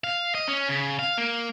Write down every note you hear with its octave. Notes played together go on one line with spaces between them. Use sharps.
F5
D#5
C#4
C#3
F5
A#3